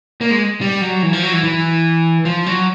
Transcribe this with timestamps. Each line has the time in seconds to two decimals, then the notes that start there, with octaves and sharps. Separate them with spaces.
0.21 A#3
0.31 G#3
0.61 G3
0.82 F#3
1.03 E3
1.13 F3
1.23 F#3
1.33 E3
1.44 E3
2.25 F3
2.46 F#3